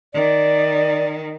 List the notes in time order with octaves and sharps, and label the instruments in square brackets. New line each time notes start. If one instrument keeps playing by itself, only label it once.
[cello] D#3 [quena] D5